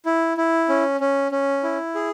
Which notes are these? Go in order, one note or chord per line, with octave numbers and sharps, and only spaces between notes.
E4
E4
C#4
C#4
C#4
E4
G#4